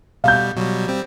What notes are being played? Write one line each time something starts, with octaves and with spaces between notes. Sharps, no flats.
B2 G3 F5 G6
B2 F#3 G3
G3 C4